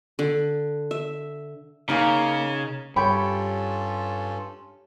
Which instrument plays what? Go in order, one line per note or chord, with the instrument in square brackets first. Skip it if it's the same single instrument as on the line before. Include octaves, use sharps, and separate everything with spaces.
[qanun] D3
E5
[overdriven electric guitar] C#3 [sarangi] A#3 [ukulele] C#4 D#4 A#4 [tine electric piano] F5 A#5
[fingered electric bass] G2 [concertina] C#4 F4 A4 [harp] G4 C#5 G5 [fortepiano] B5